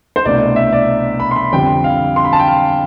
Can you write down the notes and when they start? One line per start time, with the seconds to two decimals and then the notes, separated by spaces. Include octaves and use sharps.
0.16 C5
0.25 C2 B2 A3 D4 D5
0.56 E5
0.72 D5
1.20 B5
1.31 C6
1.36 B5
1.52 F2 D3 G3 C4 G5
1.84 F5
2.16 C6
2.25 B5
2.33 A5
2.39 G5
2.47 F5